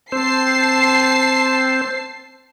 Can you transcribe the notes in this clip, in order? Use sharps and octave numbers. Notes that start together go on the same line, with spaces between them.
C4 C5 A5 C7